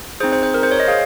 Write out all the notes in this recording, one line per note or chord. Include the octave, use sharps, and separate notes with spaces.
C4 D#4 G#4 C5
C5
C5
A#4
C5
C#5
D#5
G#4 F5